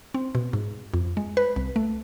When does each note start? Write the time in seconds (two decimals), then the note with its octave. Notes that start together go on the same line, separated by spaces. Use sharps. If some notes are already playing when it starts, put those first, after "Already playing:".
0.14 C4
0.35 B2
0.53 G#2
0.94 F2
1.17 G#3
1.37 B4
1.56 C2
1.76 A3